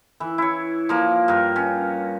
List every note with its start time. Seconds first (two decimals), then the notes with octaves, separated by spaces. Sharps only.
0.20 E3
0.38 E4 C#5
0.89 F3 A#3
1.28 G2 A#4
1.56 C#4